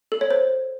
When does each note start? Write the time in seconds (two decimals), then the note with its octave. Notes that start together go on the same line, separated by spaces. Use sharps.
0.12 A4
0.21 C#5
0.30 C5